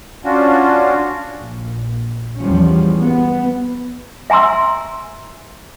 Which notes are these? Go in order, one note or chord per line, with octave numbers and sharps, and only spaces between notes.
C#4 D4 F4 F#4
A#1
E2 F3 G3 C#4
B3
E5 G#5 A#5 C6 E6